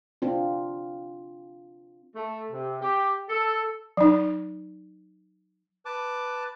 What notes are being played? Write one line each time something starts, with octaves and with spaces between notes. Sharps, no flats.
C4 D4 F4
A3
C3
G4
A4
F#3 D#4
B4 A5 D6